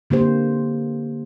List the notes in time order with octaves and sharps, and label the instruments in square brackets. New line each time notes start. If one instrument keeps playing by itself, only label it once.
[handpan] D3 A#3 G4 C5